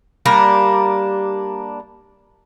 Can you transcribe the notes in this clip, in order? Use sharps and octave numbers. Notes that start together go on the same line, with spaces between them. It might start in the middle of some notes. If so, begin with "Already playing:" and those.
G3 A#3 D4 A#4